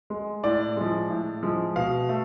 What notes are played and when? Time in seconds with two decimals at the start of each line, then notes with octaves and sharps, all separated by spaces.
0.10 G#3
0.44 A2 D5
0.77 F3 G#3
1.10 A2
1.43 F3 G#3
1.76 B2 F5
2.09 A3